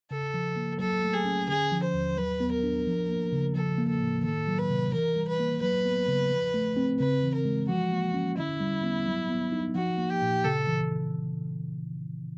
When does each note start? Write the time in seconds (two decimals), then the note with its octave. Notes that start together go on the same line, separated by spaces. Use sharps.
0.11 C#3 A4
0.34 F3
0.56 A#3
0.79 F#3 A4
1.02 A3
1.13 G#4
1.25 C#4
1.48 D3 G#4
1.72 F3
1.83 C5
1.94 D#2
2.17 F#3 B4
2.40 B3
2.52 A#4
2.63 D4
2.87 F3
3.09 A#3
3.33 C#3
3.55 F3 A4
3.78 A#3
3.89 A4
4.01 A2
4.23 D#3 A4
4.47 F#3
4.58 B4
4.70 C3
4.93 E3 A#4
5.16 G3
5.28 B4
5.39 A#3
5.61 F#3 B4
5.85 B3
6.08 C#3
6.31 F3
6.54 A3
6.77 C4
6.99 C#3 B4
7.23 E3
7.34 A#4
7.45 G#3
7.69 F3 F#4
7.92 A#3
8.14 C#4
8.37 D3 E4
8.60 G3
8.84 B3
9.07 F#3
9.30 B3
9.52 D#4
9.75 F3 F#4
9.98 A#3
10.10 G4
10.22 A#2
10.44 C#3 A4
10.67 E3